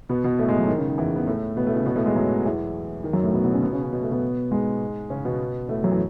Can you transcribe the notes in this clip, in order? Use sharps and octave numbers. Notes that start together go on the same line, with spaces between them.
B2 B3
B2 B3
A2 A3
G#2 G#3
F#2 F#3
D#3
C#3
D#3
E2 E3
B3
A2 A3
B2 B3
A2 A3
C#3 C#4
B2 B3
A2 A3
G#2 G#3
F#2 F#3
E2 E3
D#3
F#2 F#3
A2 A3
B2 B3
B2 B3
C#3 C#4
B2 B3
C#3 C#4
C#3 C#4
B2 B3
A3
B2 B3
G#2 G#3
C#3 C#4
B2 B3
A2 A3
F#2 F#3
E3